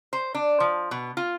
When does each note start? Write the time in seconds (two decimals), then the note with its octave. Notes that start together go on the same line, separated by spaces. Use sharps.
0.13 C5
0.35 D4
0.60 F3
0.91 B2
1.17 F4